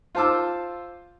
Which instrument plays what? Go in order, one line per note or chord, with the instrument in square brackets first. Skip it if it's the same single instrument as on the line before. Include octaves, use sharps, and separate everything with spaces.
[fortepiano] F4 C5 A5 D6 E6